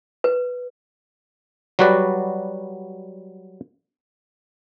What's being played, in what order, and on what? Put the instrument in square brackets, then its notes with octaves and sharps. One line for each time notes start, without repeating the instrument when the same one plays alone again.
[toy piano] B4
[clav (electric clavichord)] F#3 G3 F#4 B4 D5